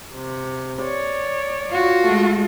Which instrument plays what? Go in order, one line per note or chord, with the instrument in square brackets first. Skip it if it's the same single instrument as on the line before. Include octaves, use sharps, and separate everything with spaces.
[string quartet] C3
C#5 D5
[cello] F4 F#4
[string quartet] G#3 A3